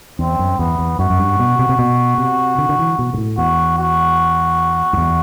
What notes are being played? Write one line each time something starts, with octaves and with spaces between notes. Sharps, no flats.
E2 C4
F#2
E2 B3
E2
F#2 F#4
F#2
G2
B2
C3
C3
B2
C3
D3
D3
E3
B2
G2
A2
E2 F#4
F#4
F#2
E2